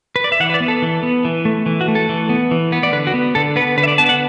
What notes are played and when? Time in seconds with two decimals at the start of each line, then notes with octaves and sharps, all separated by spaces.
0.16 B4
0.24 D5
0.32 E5
0.40 E3 F#5
0.50 B4
0.54 D5
0.60 B3
0.68 A4
0.82 E3
1.03 B3
1.25 E3
1.45 A3
1.66 E3
1.81 F#4
1.88 A3
1.95 A4
2.09 E3
2.29 B3
2.51 E3
2.72 B3
2.83 D5
2.92 D3 B4
3.07 F#4
3.14 B3
3.35 D3 A4
3.56 B3 B4
3.77 D3 B4
3.84 E5
3.88 D5
3.98 B3 A5
4.09 F#5